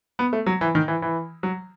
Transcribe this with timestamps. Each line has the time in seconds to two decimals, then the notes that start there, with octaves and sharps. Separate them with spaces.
0.19 B3
0.33 A3
0.46 F#3
0.61 E3
0.75 D#3
0.88 E3
1.02 E3
1.43 F#3